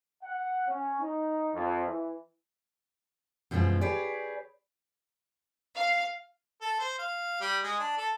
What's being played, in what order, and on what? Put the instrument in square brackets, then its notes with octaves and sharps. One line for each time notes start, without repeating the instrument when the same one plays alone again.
[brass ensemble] F#5
C#4
D#4
F2
E3
[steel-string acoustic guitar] F#2 B2 E3 F3 G#3 F4
G4 G#4 B4 C#5 D5
[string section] F5
[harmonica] A4
C5
F5
G3
G#3
D4
A4